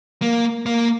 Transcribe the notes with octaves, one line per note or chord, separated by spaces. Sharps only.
A#3
A#3